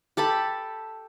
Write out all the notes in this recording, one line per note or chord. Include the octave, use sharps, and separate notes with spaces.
G4 A4 A5 B5